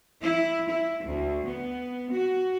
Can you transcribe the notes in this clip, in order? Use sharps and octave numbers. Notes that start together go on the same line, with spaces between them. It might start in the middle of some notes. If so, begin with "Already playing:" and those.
E4
E4
D2
B3
F#4